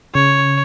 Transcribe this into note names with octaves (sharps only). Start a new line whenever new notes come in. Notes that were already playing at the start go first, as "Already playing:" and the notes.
C#3 C#5